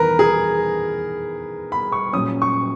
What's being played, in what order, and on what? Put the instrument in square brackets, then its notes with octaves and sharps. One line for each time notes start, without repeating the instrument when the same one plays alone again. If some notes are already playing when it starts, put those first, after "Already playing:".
Already playing: [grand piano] E2 D#3 A#4 B4
G#4
B5
C#6
A#2 F#3 C#4 D#6
C#6